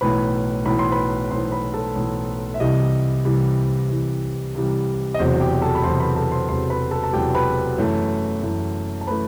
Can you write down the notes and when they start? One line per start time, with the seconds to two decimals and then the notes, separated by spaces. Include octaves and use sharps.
0.01 B1 A2 E3 B4 B5
0.66 B1 A2 E3 B5
0.79 C6
0.92 B4 B5
1.31 B1 A2 E3 C5 C6
1.52 B4 B5
1.74 A4 A5
1.96 B1 A2 E3
2.54 E5
2.60 C2 C3 E3 G3 D#5
3.25 C2 C3 E3 G3
3.90 C2 C3 E3 G3
4.55 C2 C3 E3 G3
5.14 D#5
5.19 E1 E2 C3 F#3 C5
5.41 G4 G5
5.62 A4 A5
5.75 B5
5.84 E1 E2 C3 F#3 C5 C6
6.00 B4 B5
6.16 A4 A5
6.32 C5 C6
6.48 E1 E2 C3 F#3 C5 C6
6.70 B4 B5
6.91 A4 A5
7.04 A5
7.13 E1 E2 C3 F#3 G4 G5
7.35 B4 B5
7.78 F#2 E3 A3
8.43 F#2 E3 A3
9.01 A5
9.07 E3 A3 B4 B5